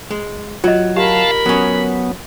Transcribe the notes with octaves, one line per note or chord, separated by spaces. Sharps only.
G#3
F#3 F4 D#5
G4 A#4 F5 A5 B5
F#3 B3 C#4